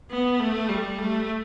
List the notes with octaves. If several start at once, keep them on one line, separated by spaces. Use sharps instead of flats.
B3
A3
G3
A3